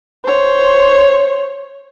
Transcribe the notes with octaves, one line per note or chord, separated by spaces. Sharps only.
C5 C#5